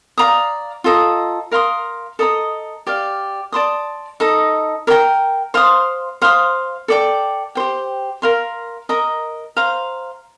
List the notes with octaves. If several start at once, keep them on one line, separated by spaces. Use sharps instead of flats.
D5 F5 A#5 D#6
F4 A4 D#5 A#5
A#4 F5 C6 D#6
A4 D#5 A#5 D#6
G4 D5 F5
D5 A5 C6 D#6
D#4 A4 D#5
A#4 D5 G5 A#5
C5 F5 C6 D#6
C5 F5 C6 D#6
A4 D5 G5 D6
G4 C5 G5
A#4 F5 C6
A#4 D#5 A#5
C5 F5 A#5